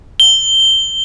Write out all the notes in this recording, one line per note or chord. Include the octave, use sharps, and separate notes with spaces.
G7